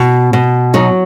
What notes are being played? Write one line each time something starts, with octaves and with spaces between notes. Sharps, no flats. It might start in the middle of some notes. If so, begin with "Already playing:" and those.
Already playing: B2
B2
F#3 D#4